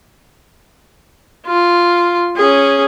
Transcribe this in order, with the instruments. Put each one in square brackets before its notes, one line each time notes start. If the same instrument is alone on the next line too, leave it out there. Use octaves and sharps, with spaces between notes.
[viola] F4
C#4 G#4